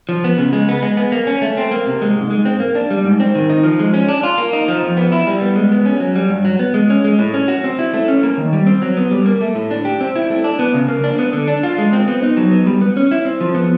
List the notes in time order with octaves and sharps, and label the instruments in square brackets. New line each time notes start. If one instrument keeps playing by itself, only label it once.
[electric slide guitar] F3
B3
C#3
G#3
B3
G#3
B3
A#3
C#4
A3
C4
A#3
C3
G#3
G#2
G#3
C4
A#3
D4
G3
G#2
C4
D#3
D#4
F3
G#3
C#4
D4
F4
A#3
D#4
F3
F2
B3
E4
G3
B3
G#3
B3
C#4
F#3
G3
G2
F#3
B3
G#3
C#4
G#3
A2
C#4
F#4
C4
E4
A3
C#4
A#3
D#3
G3
C4
F#3
B3
G3
A#3
A3
A2
D4
G4
C4
E4
A3
D4
B3
C#3
A#3
D4
B3
D3
D4
F4
G#3
C4
B3
D#4
F#3
B3
G3
B3
C#4
E4
C4
F3
B3